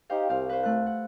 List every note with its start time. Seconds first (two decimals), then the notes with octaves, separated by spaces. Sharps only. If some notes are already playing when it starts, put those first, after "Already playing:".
0.10 D#4 G4 C5 F5
0.29 C2 G4 F5
0.49 B4 C5
0.63 A3 F#6
0.86 F#5